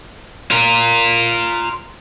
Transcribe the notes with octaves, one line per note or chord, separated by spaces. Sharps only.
F4 A#4